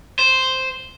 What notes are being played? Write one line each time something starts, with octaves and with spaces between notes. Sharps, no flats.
C5